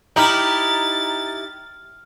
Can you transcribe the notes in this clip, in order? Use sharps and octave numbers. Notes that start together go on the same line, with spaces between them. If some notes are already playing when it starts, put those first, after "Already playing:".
D#4 E4 G4 A#5 F6 A6 F#7